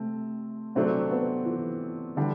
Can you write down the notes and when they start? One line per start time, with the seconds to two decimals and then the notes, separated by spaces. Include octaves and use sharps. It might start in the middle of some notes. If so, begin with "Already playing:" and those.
Already playing: C3 A3 C4
0.75 C3 F#3 A3 C4 D4
1.11 B3
1.46 E3
2.17 D3 E3 G3 D4